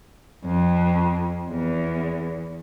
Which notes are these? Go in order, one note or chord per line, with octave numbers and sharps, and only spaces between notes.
F2
E2